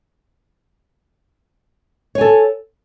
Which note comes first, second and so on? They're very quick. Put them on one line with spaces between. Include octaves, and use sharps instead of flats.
C#5 G#5 A4